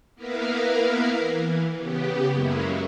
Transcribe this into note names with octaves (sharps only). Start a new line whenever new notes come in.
A#3 B3 E4 A#4 B4 F5
E3
C#3 B3 G4
F#2 F#3 G#3 A#3 C#4 E4